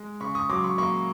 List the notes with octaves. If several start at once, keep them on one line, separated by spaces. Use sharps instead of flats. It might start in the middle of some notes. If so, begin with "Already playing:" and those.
Already playing: G#3
C#3 B5 C#6
C#6 D#6
F#3 C6 D6
B5 C#6
A#3 B5 C#6